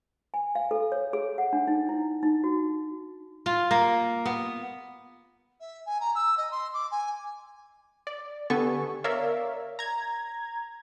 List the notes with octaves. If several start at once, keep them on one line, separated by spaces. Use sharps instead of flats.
G#5
F5
A4
C#5
G#4
F#5
D4
D#4
E4
D#4
F#4
F4
A#3
B3
E5
G#5
A#5
E6
D#5
C6
D6
G#5
D5
D3 B3 G4 A4 G#5 C#6
A#4 C#5 D5 E5 F5
A#5 G#6